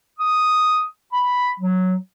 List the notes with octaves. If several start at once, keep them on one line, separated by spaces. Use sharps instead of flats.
D#6
B5
F#3